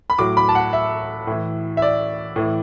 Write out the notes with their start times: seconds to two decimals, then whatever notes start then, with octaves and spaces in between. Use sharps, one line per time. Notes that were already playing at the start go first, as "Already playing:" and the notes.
0.10 B5
0.19 A2 F#3 D6
0.37 B5
0.49 A5
0.55 F#5
0.73 E5
1.27 A2 E3
1.77 E5
1.82 D5
2.36 A2 E3